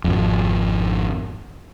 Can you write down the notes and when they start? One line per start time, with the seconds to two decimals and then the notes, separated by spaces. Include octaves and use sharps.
0.04 G#1 F2